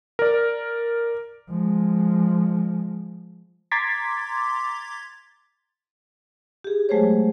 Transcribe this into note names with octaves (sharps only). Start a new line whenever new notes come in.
A#4 D5
F3 G#3
A#5 C6 D6 G#6 A6 B6
G4 G#4
F#3 G#3 A3 G#4 C5 C#5